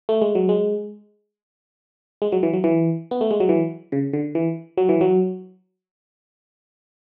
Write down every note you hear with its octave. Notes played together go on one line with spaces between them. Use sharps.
A3
G#3
F#3
G#3
G#3
F#3
E3
F#3
E3
B3
A3
G#3
F#3
E3
C#3
D3
E3
F#3
E3
F#3